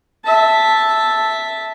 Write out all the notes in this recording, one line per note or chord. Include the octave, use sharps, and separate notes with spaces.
E5 A5